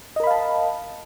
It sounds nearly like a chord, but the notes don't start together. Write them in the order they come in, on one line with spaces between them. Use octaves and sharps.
D#5 A#4 B5 F5 A5